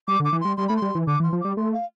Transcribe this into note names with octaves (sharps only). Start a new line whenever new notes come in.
G3 D6
D3
D6
E3
G3 C6
G3 C6
A3 B5
C6
G3
E3
D3 D6
E3 C6
F3
G3 D6
A3 C6
F5